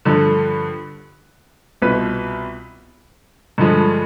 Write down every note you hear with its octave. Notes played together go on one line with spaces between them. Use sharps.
G2 D3 F3
C2 B2 B3 F4 B4
G2 D3 F3 G#3